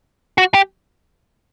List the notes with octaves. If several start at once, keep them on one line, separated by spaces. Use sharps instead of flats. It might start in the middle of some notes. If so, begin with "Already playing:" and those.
F#4
G4